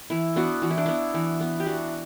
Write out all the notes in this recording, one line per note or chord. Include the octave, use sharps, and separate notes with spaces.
E3 E4
B3 D4 F#4
E3 F#4
E4
D4
B3 E4
E3
B3
G4
E3 D4 F#4